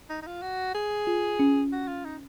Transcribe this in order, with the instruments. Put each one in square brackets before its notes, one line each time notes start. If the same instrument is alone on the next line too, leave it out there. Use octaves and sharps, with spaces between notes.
[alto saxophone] D#4
D#4
F4
F#4
G#4
[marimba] F4
C#4
[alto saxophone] F#4
F4
D#4